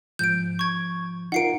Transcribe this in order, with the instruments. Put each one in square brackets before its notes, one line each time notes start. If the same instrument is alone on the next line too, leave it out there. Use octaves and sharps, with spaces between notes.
[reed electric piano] G#2 F3 [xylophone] G6 D7
[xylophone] C#6 G#6
[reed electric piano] D#4 F4 A#4 [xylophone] F#5 C7 D7